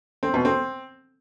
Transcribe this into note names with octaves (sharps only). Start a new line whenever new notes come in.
C4
B2
C4